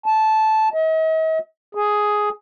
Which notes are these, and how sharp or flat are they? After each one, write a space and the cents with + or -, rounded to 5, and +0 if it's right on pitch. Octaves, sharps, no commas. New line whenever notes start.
A5 -10
D#5 +45
G#4 +5